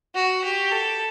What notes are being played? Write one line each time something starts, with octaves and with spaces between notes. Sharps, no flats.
F#4
G4
A4